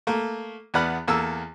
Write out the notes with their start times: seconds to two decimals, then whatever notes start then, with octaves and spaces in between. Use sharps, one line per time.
0.07 A3 A#3
0.74 E2 B3 D5 F#5 B5 F6
1.08 E2 A#3 A4 E6